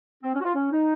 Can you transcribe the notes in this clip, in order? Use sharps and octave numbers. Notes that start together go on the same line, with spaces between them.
C4
C#4
F#4
F4
C#4
D#4